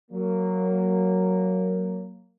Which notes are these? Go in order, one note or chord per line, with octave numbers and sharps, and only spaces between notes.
F#3 A#3